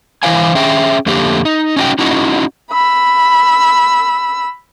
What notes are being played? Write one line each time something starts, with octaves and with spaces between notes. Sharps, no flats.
E3 E4 C5 F5 G#5
C#4 G#4 E5 G5
F2 D3 A3 A#3 G4
D#4
C#4 D#4 F#4 G5
C#4 D#4 E4 F#4
B5 E6